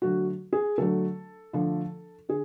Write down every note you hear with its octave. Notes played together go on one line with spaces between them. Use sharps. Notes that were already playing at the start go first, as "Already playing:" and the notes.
D3 F#3 A3 F#4
G#4
D3 F#3 A3 A4
D3 F3 A3
D3 G#4